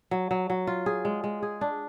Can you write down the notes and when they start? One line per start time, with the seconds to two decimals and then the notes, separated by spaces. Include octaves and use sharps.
0.11 F#3
0.31 F#3
0.50 F#3
0.67 F4
0.86 G#4
1.05 G#3
1.24 G#3
1.42 G#4
1.61 D4